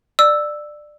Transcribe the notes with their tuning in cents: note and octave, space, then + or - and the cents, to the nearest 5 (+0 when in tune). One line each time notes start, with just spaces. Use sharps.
D5 +20 E6 +0